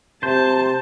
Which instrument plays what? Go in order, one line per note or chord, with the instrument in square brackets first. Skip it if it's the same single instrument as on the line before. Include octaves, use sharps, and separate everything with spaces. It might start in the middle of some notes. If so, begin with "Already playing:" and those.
[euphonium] C3 [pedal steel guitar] C5 [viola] A5